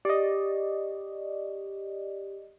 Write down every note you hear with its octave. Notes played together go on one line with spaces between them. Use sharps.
G4 D5 D#5